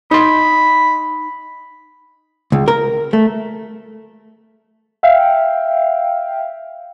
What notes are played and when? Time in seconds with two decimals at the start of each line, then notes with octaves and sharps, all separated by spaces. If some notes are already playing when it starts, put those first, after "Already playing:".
0.11 D#4 B5 C6
2.52 C#2
2.68 A#4
3.13 A3
5.03 E5 F5 G5